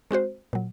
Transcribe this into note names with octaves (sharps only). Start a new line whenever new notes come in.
G#3 C4 F#4 C5
A#2 F#3